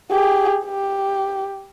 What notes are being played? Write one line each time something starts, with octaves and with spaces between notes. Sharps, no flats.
G4 G#4
G4